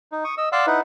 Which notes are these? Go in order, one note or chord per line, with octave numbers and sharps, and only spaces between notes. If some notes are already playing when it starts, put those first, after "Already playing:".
D#4
C#6 D#6
D#5 E6
D5 F5 F#5 C6 E6 F#6
D#4 E4 B4 F#5